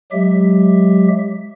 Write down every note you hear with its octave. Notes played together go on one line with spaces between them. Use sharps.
F#3 G#3 G4 E5